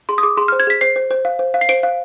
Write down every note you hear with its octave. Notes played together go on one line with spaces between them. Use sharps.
G#4 C6
D#6
G#4 D6
G#4 C6
F6
C5
G#6
G#4 B6
C5 C7
C5
C5
F5
C5
F5
C7
C5 D7
F5